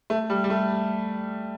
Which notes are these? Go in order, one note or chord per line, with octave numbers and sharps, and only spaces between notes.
A3
G3
G3
A3